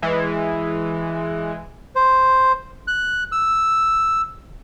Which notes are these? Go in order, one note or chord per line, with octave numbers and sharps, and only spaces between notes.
E3 G#3
C5
F#6
E6